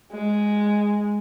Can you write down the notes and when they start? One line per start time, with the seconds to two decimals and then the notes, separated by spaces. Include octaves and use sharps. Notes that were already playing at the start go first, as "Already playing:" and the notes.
0.12 G#3